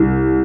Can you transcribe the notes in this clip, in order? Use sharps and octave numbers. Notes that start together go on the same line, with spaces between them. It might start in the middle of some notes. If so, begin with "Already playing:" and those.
Already playing: C2